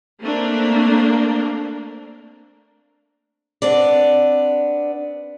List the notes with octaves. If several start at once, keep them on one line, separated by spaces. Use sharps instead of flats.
A3 A#3 C4 D4 A#4
B3 C4 D4 D5